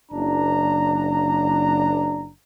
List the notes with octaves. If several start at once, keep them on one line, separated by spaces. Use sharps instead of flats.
F#1 D4 A#5